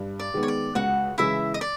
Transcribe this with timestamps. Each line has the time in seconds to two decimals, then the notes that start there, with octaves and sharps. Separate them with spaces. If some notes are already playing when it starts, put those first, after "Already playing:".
Already playing: G2
0.20 D5
0.34 D#3 G#3 B3
0.43 C#5
0.48 D5
0.75 C#2 F#4 F#5
1.18 C#3 E3 G#3 E4 E5
1.54 D#5
1.61 D5